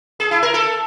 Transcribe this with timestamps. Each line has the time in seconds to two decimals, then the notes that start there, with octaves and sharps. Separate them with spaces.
0.20 G#4
0.31 E4
0.43 A#4
0.54 A4